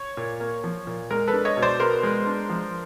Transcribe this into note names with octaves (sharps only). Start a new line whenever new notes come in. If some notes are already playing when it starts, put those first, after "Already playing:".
Already playing: C#5
A#2
A#3
F3
A#2
G#3 A#4
A4 B4
D4
C#5 D#5
B2
C5 D5
B3 A#4 C5
G#3
D4
F3